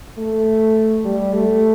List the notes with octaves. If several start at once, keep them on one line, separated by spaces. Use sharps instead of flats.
A3
G3
A3